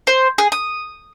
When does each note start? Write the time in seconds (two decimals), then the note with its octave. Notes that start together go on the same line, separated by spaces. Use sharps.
0.07 C5
0.38 G#4
0.52 D#6